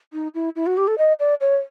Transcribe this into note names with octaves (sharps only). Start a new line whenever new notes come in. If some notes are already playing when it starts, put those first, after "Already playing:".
D#4
E4
E4
F#4
G4
A4
D#5
D5
C#5